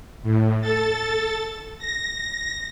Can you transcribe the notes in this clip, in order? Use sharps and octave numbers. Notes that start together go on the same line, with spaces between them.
A2
A4 A6
A#6